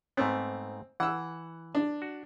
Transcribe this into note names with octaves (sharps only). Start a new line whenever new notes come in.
G#2 A3 B3 C4
E3 F#5 E6
D4
F#4